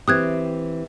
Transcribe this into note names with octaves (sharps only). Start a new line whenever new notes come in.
E3 C4 G4 D#6 F#6 G#6